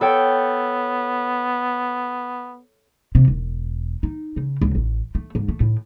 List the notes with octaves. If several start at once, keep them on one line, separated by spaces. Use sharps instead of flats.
B3 A4 C#5 G5
C3
E1
D#4
C#3
C#2
A1
A3
G#2
A3
A2